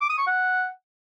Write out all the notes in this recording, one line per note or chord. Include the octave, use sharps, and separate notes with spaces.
D6
D#6
C#6
F#5